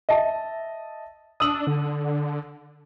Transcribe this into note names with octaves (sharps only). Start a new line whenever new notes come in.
D#5 E5 A5
D4 D#6 E6 F#7
D3